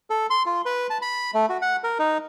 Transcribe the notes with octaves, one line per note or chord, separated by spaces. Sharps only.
A4
C6
F4
B4
A5
B5
A3
F#4
F#5
A#4
D#4